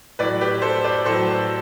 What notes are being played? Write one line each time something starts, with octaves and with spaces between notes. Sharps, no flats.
A2 F#3 B4 D5
G4 B4
A4 C5
B4 D5
A2 F#3 A4 C5